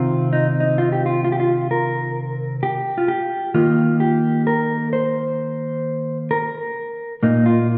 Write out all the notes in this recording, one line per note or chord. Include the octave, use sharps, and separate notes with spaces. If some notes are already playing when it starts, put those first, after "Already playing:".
Already playing: C3 D#3 C4 F4
D#4
D#4
F4
G4
F4
F4
G4
F4
A#4
G4
F4
G4
D#3 A#3 F4
G4
A#4
C5
A#4
A#2 A#3 D#4
F4